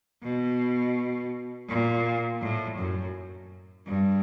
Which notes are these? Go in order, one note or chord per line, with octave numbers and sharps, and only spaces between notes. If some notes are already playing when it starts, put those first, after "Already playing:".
B2
A#2
A2
F#2
G2